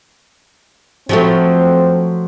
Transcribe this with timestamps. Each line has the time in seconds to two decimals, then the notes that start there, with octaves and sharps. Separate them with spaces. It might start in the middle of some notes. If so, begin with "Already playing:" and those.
1.09 F3 F#3 A3 C4